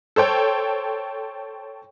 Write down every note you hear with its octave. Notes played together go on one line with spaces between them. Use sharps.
A4 C5 C#5 G5